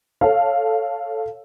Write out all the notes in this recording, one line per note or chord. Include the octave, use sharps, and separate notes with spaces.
A4 C#5 F5